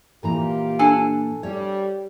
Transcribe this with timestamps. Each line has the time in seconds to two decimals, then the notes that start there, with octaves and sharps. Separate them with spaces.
0.23 A#2 E3 F4 G4 A#4 A#5
0.79 D4 A4 G#5
1.43 G3 C#5